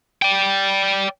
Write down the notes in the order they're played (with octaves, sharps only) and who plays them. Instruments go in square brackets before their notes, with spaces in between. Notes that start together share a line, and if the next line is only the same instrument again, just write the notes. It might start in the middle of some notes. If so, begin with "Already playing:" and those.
[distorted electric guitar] D5 G5